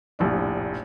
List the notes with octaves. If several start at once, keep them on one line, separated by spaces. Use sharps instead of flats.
F1 A#1 A2 D4